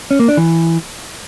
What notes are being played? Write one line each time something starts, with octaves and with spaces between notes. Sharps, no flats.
C#4
A#3
D4
E3